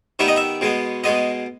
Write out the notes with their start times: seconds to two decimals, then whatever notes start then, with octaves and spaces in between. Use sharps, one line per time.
0.19 D#3 G3 B3 E5
0.28 D#5
0.36 E5
0.61 B2 G#3 B3
1.04 B2 G#3 B3 D#5